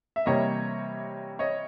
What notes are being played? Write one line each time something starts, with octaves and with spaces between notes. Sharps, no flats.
E5
C3 E3 G3 A#3 C#5 D#5
C#5 D#5